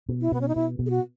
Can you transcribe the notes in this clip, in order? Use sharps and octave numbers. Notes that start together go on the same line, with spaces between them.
B2
E4
B2 B3
C#4
D#4
B2 E4
B2
G#4
F#4